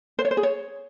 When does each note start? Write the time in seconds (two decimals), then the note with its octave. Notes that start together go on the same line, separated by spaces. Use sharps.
0.19 C5
0.25 C#5
0.31 C5
0.37 G#4
0.43 C#5